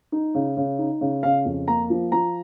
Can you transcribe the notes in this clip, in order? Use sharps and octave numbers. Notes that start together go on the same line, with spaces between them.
D#4
C#3
C#3
D#4
C#3
C#3 F5
F2
A#3 A#5
F3
F3 A#5